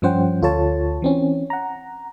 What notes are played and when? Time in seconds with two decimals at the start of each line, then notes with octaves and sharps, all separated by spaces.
0.02 G2 F3 C#4 C5 F#5 G5
0.42 D2 F4 A4 C#5 A5
1.02 E3 C4 C#4
1.50 F#5 A#5